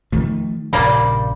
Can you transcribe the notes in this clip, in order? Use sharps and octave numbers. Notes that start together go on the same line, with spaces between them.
D#3 F3 A3
A#1 G2 C#3 G3 A#3 D5